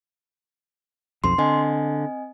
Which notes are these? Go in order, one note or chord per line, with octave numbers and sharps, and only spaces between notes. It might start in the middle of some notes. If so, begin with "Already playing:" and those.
B1 F2 C6
D3 C4 D#5 G#5